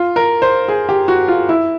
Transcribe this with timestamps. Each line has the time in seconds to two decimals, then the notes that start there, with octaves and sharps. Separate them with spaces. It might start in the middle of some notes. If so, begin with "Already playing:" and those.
Already playing: F4
0.16 A#4
0.42 C5
0.68 G#4
0.89 G4
1.08 F#4
1.28 F4
1.49 E4